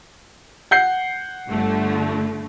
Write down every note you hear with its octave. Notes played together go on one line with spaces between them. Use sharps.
F#5 G6 C7
G1 D3 A3